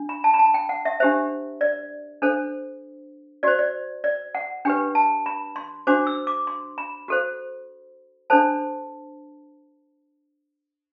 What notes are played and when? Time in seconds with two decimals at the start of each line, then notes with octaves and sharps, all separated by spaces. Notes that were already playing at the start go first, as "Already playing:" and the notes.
Already playing: D4
0.09 B5
0.24 A5
0.34 B5
0.39 A5
0.54 G5
0.69 F#5
0.85 E5
1.00 D4 G4 C5 E5
1.61 D5
2.22 D4 A4 C5
3.43 F#4 C5 D5
3.59 D5
4.04 D5
4.35 F#5
4.65 D4 G4 B4 G5
4.95 A5
5.26 B5
5.56 C6
5.87 D4 F#4 C5 D6
6.07 E6
6.27 D6
6.47 C6
6.78 B5
7.08 F#4 A4 C5
8.30 D4 A4 C5 A5